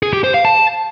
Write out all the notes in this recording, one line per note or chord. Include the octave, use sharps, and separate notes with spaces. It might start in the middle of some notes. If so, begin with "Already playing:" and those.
G#4
G4
C5
F5
A5